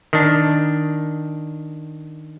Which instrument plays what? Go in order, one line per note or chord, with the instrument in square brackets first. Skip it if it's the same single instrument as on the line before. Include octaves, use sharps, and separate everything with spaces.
[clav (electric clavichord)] D#3 D4